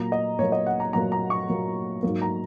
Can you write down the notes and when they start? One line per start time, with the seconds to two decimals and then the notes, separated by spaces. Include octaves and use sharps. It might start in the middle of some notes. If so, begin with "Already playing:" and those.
Already playing: A#2 F#3 A#3 A#5
0.12 D#5
0.39 A#2 F#3 A#3 C#5
0.52 D#5
0.66 F#5
0.80 A#5
0.93 A#2 F#3 A#3 A#5
1.12 A#5
1.30 C#6
1.49 A#2 F#3 A#3
2.03 G#2 F#3 A#3
2.22 A#5